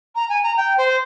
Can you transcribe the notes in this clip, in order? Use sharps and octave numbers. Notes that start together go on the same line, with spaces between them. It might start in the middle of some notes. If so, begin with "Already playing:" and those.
A#5
G#5
A#5
G5
C5